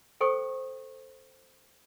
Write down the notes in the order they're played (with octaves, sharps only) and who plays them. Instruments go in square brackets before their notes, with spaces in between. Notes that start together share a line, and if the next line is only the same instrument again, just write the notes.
[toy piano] A4 C5 G5 C#6 D#6